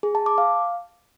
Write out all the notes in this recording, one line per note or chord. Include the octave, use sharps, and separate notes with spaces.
G#4
A5
D6
F5